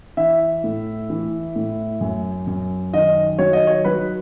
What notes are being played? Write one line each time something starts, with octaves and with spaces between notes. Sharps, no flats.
E3 E5
A2
E3
A2
F#2
F#2
D#3 D#5
F#3 C#5
D#5
C#5
F#3 B4